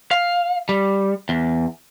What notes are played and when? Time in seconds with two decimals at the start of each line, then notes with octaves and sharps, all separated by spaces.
0.11 F5
0.69 G3
1.29 E2